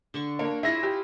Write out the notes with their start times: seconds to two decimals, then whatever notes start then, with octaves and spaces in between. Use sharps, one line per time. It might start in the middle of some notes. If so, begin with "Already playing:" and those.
0.14 D3 D4 C#6
0.39 A#3 D4 C#5
0.63 E4 F4 G#4 E5 A#6
0.83 G4